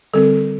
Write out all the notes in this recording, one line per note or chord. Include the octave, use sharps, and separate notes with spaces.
D3 G3 C4 A4